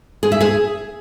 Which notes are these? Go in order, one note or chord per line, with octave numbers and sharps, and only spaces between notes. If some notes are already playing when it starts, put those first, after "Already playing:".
G#4
E5
G#4